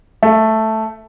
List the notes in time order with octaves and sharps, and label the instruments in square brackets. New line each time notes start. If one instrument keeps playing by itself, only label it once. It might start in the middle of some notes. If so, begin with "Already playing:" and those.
[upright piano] A3